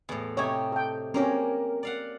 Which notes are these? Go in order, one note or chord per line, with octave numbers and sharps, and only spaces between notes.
E2 A2
C3 D#4 G4 C#5
A4 G5
A#3 C4 C#4 G4 A#4
D5 F5 F#5